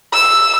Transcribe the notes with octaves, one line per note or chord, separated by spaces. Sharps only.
E6